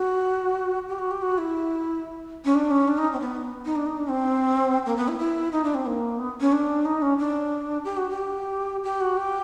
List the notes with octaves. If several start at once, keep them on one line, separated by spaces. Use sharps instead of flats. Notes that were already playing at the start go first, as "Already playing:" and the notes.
Already playing: F#4
G4
F#4
G4
F#4
E4
C#4
D4
C#4
D4
D#4
C4
B3
D#4
D4
D#4
D4
C4
A#3
B3
E4
E4
D#4
D4
C4
A#3
B3
C#4
D4
D#4
C#4
D4
G4
F#4
G4
G4
F#4
G4